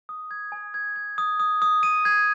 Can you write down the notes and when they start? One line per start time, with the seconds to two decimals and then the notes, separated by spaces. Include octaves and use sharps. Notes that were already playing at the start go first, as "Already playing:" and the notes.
0.09 D#6
0.31 G#6
0.52 G#5
0.74 G#6
0.96 G#6
1.18 D#6
1.40 D#6
1.62 D#6
1.83 D#7
2.05 G#6